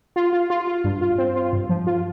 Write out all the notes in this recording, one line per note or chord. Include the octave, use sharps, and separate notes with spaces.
F4
F4
F4
F4
G2
F4
C4
F4
G2
F3
F4